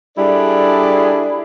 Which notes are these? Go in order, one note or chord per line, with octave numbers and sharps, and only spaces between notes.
G3 D4 E4 G#4 A4 D5